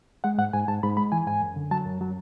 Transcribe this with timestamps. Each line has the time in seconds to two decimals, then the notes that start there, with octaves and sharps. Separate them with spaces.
0.24 G#3 F#5
0.38 G#2 F#5
0.53 G#2 G#5
0.68 G#2 A5
0.83 G#2 B5
0.97 G#3 B5
1.12 E3 G#5
1.27 G#2 G#5
1.41 F#2
1.56 D3
1.71 F#3 A5
1.85 F#2
2.01 F#3